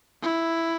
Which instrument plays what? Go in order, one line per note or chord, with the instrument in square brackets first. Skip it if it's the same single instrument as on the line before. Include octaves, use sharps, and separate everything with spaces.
[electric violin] E4